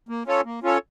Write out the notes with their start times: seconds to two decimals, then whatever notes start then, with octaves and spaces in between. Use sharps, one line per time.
0.09 A#3
0.27 C#4 F4 A4 C#5
0.45 A#3
0.63 C#4 F4 A4 C#5